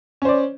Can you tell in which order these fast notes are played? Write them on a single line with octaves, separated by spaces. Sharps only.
C#4 C5 D5